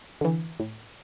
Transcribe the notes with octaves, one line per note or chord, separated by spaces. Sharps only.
D3 E3
A2